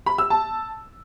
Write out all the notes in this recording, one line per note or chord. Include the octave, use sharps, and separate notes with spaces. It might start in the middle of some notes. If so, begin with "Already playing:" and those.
B5
E6
A5